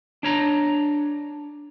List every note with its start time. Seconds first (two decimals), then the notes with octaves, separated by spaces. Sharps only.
0.23 D4 C#5 A#5